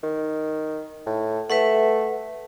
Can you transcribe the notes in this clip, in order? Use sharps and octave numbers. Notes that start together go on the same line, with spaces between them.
D#3
A2
A3 B4 E5 F#5